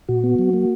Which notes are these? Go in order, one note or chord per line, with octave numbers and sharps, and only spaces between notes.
A#2 F#4
B3
F#3
A#3